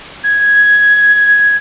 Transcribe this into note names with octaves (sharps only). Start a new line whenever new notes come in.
G#6